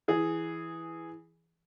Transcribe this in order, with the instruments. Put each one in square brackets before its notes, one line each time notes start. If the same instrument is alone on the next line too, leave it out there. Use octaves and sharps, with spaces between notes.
[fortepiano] E3 G#4